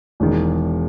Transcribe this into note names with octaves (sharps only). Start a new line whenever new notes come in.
E1 E2 D#3